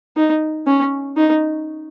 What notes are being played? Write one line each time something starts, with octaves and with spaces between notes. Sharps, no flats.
D#4
C#4
D#4